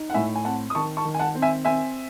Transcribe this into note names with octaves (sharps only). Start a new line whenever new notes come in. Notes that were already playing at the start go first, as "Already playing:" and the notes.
Already playing: D#4
F#5
A2 E5 G#5
G#5
C4 F#5 A5
D#6
D#3 A5 C#6
A5 C#6
D#3
G#5
F#5 A5
C4
E5 G#5
C4 E5 G#5